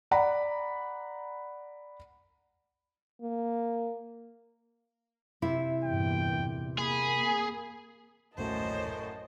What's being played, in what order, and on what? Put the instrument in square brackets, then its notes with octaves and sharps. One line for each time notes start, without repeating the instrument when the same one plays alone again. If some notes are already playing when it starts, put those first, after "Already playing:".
[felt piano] D5 F#5 A#5 B5
[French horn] A#3
[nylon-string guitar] C3 E4
[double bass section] E2 G2 A#2 [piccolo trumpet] G5
[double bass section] A#3 [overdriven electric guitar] G#4 [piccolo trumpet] B5
[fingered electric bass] D#1 A1 A3 [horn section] F#2 A2 [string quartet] C5 [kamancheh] D#5 A5